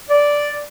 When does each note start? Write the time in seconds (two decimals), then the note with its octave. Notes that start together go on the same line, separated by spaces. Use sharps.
0.10 D5